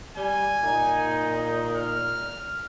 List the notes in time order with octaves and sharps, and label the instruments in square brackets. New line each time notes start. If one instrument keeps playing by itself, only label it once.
[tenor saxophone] G3 [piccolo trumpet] G#5
[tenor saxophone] A#2 [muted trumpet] D#4
[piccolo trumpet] F6